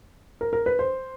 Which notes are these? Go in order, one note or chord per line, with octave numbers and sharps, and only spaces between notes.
A#4
A#4
B4
C5